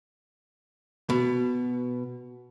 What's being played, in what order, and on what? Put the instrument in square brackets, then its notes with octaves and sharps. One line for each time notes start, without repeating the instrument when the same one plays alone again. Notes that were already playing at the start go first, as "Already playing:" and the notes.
[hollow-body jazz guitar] B2